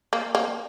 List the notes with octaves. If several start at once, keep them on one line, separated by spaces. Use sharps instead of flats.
A#3
A#3